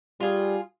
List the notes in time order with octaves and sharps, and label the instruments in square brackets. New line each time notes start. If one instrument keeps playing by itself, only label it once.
[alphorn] G3 [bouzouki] F4 G#4